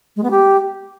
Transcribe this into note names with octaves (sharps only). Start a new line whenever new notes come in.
G#3
B3
G4